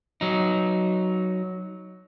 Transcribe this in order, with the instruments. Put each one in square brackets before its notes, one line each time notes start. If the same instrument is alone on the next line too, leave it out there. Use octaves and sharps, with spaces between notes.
[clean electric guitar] F#3 D#4